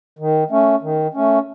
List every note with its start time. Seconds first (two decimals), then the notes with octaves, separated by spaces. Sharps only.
0.19 D#3
0.50 A3 C#4
0.82 D#3
1.14 A3 C#4